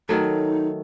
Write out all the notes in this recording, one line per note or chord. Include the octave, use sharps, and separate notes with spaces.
D#3 F#3 A3 D#4